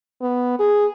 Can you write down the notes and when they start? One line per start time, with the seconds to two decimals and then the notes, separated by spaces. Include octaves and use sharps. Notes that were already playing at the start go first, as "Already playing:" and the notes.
0.21 B3
0.59 G#4